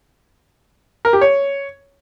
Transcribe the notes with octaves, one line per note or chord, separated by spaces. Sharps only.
A#4
G4
C#5